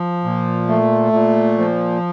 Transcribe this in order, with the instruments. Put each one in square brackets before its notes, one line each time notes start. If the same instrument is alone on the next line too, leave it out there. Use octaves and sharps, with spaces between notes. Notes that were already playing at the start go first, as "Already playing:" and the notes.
Already playing: [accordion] F3
A#2
A3
A#2
F3